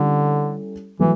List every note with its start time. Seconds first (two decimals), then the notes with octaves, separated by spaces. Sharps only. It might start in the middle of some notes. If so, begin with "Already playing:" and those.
Already playing: D3 G3 C#4 E4 A4
0.99 E3 F#3 A3